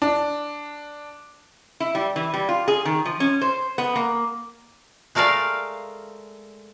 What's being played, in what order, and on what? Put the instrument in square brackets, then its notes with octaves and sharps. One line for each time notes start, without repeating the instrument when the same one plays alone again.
[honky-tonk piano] D4
[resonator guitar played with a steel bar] E4
G3
E3
G3
F4
G#4
D#3
F3
C#4
C5
B3
A#3
[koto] G#3 A3 A#4 D5 F5